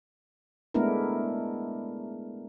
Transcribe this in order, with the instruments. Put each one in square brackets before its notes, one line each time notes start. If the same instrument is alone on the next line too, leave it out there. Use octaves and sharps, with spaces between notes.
[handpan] G#3 A3 B3 D4 E4 A#4